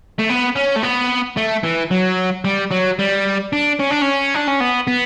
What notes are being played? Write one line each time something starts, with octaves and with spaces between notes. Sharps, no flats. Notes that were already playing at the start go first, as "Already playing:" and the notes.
A3
B3
C#4
A3
B3
A3
E3
F#3
G3
F#3
G3
D4
C#4
D4
C#4
D4
C#4
B3
B3